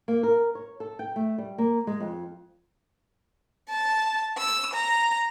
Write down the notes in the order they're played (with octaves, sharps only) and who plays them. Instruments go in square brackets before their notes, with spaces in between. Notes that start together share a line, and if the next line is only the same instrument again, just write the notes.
[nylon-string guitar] A#3
A#4
C#5
A4
G5
A3
G3
A#3
G#3
F2
[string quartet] A5
E6
A#5